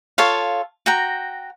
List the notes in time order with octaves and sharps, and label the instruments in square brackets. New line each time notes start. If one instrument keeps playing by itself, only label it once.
[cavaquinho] F4 A4 C#5 F5
F#4 G5 A#5